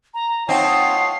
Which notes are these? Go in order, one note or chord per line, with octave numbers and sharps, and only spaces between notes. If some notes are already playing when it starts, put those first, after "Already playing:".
A#5
C4 D#4 F4 C#5 F#5 A5 C7